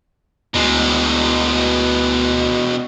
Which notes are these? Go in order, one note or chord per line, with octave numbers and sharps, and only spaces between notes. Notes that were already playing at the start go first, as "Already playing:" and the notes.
D2 B2 G#3